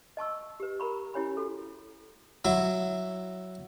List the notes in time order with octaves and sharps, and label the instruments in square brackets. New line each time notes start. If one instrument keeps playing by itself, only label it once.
[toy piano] D#5 A5 C#6 E6
G4 B4
A#4 A#5 B5 C#6
C#4 E4 G4 C#5 G#5 B5
F#4 A4
[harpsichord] F#3 E4